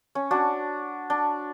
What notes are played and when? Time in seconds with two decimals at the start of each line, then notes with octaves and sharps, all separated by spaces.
0.15 C#4
0.31 D4 F#4
1.10 D4